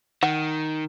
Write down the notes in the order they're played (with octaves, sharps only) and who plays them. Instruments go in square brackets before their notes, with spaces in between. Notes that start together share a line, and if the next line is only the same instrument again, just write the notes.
[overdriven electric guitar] D#3 [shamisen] F#5